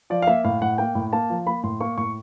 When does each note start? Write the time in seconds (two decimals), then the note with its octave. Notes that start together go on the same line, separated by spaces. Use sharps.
0.10 F3 D5
0.22 F5
0.27 A#3 E5
0.44 A2 F5
0.62 A2 F#5
0.78 A#3 G5
0.95 A2
1.13 A#3 A5
1.30 F3
1.46 A#3 B5
1.63 A2 C6
1.80 A#3 C#6
1.97 A2 C#6